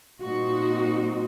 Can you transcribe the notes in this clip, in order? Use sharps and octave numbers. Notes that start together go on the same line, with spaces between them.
A#2 G3 C4 D#4 F#4